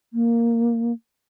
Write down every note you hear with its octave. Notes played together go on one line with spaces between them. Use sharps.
A#3